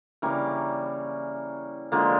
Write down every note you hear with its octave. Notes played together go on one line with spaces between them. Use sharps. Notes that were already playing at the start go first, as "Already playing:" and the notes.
C#3 E3 G3 A#3
D3 F3 G#3 A#3